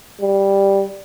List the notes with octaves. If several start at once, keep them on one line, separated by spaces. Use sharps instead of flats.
G3